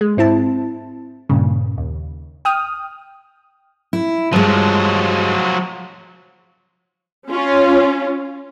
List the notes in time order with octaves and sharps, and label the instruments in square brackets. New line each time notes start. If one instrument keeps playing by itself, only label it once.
[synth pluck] G#3
G#2 C4 E4 A5
G2 A#2 C#3
D#2
G5 D#6 F6
[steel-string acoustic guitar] E4
[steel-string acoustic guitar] G2 G#3 [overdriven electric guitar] F3 F#3
[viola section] C#4 F4